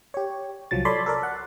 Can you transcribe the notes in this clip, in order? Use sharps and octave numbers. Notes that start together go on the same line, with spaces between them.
G4 C#5
C2 F3 F#3 A6
A4 C#5 D5 B5 C6
A4 A#4 D5
F#5